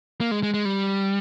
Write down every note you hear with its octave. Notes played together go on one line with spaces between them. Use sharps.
A#3
G#3
G#3
G#3
G3